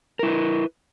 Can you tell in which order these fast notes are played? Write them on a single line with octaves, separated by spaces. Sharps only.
A#4 E4 B4